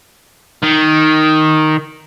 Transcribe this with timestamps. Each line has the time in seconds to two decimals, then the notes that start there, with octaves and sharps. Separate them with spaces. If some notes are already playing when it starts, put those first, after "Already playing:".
0.62 D#3